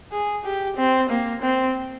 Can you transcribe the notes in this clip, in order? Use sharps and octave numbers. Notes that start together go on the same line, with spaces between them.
G#4
G4
C4
A#3
C4